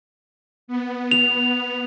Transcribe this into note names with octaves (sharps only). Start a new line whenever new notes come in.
B3
F7